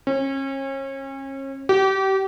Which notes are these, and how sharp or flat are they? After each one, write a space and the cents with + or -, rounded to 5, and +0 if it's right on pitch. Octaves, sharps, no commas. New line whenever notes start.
C#4 -35
G4 -30